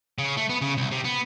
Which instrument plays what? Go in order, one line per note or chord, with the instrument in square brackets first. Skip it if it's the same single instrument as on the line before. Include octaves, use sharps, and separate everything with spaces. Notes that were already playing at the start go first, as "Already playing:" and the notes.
[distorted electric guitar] C#3
A3
B3
C#3
C2
C3
B3